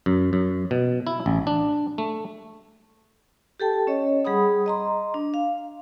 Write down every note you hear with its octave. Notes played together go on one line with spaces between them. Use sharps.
F#2
F#2
B2
E4
A1
D4
A3
G4 A4 G5 A5
C#4 C#5 D#5
G3 G#4 F#5 B5 D#6
D#5 A#5 C6
D4
F5